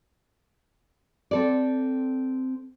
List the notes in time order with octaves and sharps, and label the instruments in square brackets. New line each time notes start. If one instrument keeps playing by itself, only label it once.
[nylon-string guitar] C4 A4 D5